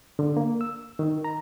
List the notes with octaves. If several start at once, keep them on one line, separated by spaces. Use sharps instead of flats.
D3
A#3
E6
D#3
A#5